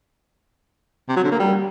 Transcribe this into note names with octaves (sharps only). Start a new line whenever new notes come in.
C3
F#3
D3
A#3
G3